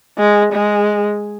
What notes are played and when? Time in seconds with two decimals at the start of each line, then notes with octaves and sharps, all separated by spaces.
0.18 G#3
0.53 G#3